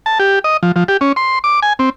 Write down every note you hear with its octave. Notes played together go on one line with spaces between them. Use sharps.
A5
G4
D#5
F3
F3
G4
C#4
C6
D6
G#5
C4